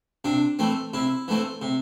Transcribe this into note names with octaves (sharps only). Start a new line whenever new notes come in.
C3 D4
E3 A3 C4
C3 E4
E3 A3 C4
C3